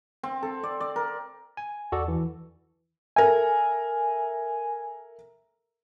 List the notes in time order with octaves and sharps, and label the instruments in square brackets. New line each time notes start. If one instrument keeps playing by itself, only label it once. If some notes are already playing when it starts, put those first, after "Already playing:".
[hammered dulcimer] C4
A4
D5
D5
A#4
[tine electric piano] G#5
[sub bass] E2 [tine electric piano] F#4 A4 D5
[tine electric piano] E3
[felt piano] A4 A#4 E5 [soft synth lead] G#5